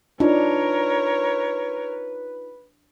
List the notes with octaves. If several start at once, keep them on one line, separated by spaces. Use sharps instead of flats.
D4 D#4 F4 A#4 B4 C#5 D#5